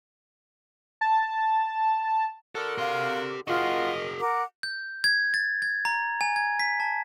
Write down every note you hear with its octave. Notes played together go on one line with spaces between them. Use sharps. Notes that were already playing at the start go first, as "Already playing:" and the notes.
A5
D3 F#4 A4 A#4
G4 F5 C6
F4 F#4 G#4 A#4 D#5 F#5
A#4 F#5 D6
G6
G#6
A6
G#6
A#5
G#5
G#6
B6
A5